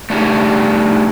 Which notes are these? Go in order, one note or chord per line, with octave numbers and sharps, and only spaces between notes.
A3 D4 D#4 F4 G4 G#4